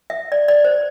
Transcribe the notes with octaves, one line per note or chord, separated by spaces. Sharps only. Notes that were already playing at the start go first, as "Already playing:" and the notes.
E5
D5
D5
C5